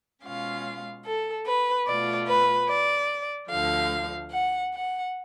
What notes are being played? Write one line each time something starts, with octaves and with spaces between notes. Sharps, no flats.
B2 G#3 C#4 F4 F5
A4
B4
B2 A3 F4 D5
B4
D5
D2 D3 F3 F5
F#5
F#5